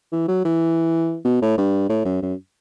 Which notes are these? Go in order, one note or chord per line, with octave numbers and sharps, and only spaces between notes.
E3
F#3
E3
B2
A2
G2
A2
F#2
F#2